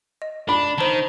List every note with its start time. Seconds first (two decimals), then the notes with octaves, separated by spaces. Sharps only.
0.22 D#5
0.49 D4 B5
0.78 D#3 C5 A5